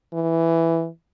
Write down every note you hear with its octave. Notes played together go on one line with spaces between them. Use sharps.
E3